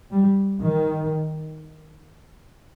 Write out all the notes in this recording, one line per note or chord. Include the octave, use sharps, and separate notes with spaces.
G3
D#3